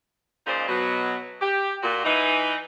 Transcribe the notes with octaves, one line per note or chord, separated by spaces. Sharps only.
A#2 C#3 G#3 D#4 C5 D5
B2 F#3
G4
A#2 F#4
E3 D#4